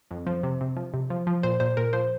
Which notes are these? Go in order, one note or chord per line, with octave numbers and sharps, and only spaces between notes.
F2
F3
C3
C3
F3
C3
F3
F3
A#2 C5
A#2 C5
A#2 A#4
F3 C5